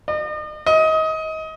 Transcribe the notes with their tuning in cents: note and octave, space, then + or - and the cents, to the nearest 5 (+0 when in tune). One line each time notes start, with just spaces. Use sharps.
D#5 -40
D#5 +25